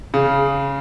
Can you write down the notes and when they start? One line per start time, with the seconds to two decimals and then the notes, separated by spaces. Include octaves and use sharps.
0.14 C#3